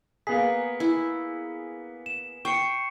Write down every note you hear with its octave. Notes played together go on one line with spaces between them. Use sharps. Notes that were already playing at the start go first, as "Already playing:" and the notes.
A#3 B3 G#4 B6
E4
E7
G5 C#6 C7 C#7